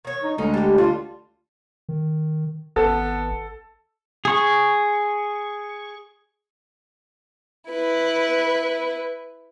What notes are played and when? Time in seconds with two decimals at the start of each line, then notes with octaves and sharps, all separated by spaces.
0.05 D#3 C#5
0.23 D#4
0.38 D2 D3 G#3 D#4
0.54 G3 G4
0.78 G3 F4
1.89 D#3
2.76 G#1 B3 A4
4.25 G#4 C#6
7.71 E4 B4